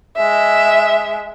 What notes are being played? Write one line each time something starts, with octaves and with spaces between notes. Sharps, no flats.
G#3 E5